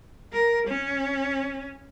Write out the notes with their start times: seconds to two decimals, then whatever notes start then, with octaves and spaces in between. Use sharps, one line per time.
0.33 A#4
0.67 C#4